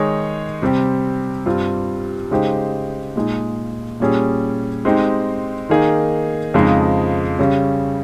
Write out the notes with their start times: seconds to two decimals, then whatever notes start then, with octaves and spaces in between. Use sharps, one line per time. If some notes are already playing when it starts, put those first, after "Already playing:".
Already playing: D#3 G#3 D#4 G#4 C#5
0.62 C3 G3 C4 G4
1.46 G2 G3 C4 F4
2.31 C#3 G#3 D#4 G4 C5
3.16 A#2 G#3 D#4 G#4
4.00 A#2 G3 C#4 G#4
4.85 G#3 C4 D#4 G4
5.69 D#3 A#3 D#4 G#4
6.54 F2 C#3 F3 G#3 D#4
7.39 C#3 G3 C#4